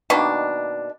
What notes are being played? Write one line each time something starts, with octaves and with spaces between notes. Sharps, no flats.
B2 D#3 A#3 D4